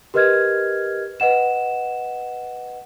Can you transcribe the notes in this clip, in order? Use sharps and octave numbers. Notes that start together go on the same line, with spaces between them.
G4 A#4 B4 D#5 F6 G#6
B4 D#5 F#5 E7